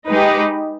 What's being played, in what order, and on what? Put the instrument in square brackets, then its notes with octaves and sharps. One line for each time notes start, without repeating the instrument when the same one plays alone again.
[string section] G#3 D#4 G4 B4